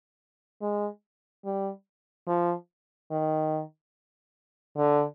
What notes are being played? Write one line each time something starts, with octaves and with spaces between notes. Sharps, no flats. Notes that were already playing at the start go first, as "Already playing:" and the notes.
G#3
G3
F3
D#3
D3